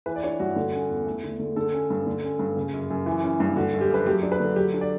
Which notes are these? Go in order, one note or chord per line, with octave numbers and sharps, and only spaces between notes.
E3 B4
D5
D4 C#5
G2 F#4
D3
C#4
E2
A3
D3
D3
D3 A4
C#4
G2
D3
C#4
G2
C#3
F#2
F#2
E3
C#4
G2
D3 F#4
F#2
G4
F#2 B4
F#3 G4
D4
B4
D3
F#3 G4
D4
D5